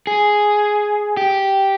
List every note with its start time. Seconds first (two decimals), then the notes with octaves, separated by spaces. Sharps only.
0.07 G#4
1.17 G4